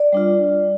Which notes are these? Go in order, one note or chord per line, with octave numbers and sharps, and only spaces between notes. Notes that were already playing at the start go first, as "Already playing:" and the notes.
Already playing: D5
G3 D4 F4